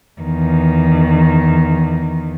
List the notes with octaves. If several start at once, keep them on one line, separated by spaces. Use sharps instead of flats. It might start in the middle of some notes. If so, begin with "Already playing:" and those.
E2 D#3